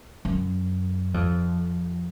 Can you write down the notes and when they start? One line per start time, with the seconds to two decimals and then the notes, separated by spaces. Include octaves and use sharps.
0.25 F#2
1.14 F2